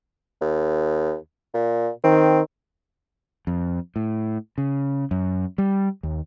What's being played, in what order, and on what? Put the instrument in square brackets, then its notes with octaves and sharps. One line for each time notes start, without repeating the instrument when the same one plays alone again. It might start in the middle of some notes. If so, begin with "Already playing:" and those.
[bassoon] D#2
A#2
[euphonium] D#3 [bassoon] C4
[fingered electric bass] F2
A2
C#3
F#2
G3
D#2